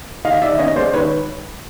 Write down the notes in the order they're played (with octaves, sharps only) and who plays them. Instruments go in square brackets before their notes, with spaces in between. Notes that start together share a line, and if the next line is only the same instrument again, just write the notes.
[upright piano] D#3 D#5 F5
D#3 D5 E5
C#4 C#5 D#5
G#3 C5 D5
D#3 B4 C#5